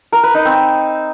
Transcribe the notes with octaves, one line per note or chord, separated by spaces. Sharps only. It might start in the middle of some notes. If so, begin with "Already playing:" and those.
A#4
B4
D#4
C4